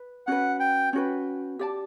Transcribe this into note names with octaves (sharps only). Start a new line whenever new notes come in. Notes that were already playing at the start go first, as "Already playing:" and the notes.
Already playing: B4
C#4 F#4 B4 F#5
G5
C#4 F#4 B4
G4 D5 A5